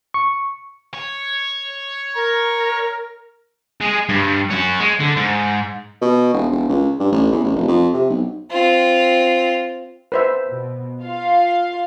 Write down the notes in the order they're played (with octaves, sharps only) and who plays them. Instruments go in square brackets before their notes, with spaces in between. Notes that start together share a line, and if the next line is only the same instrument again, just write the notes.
[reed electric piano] C#6
[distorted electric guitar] C#5
[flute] A#4 [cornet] A#5
[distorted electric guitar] G#3 G#4
G2
C#4 F#4
G#3
D3
G#2
[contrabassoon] B2
E1
E1
C#2
G2
A1
E2
A1
F1
F2
C3
B1
[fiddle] C4 F4
[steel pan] B4 C5 E5
[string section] B2
F4 F5